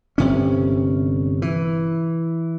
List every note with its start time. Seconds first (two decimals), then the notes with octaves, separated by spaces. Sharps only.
0.18 G1 C3 C#4
1.42 E3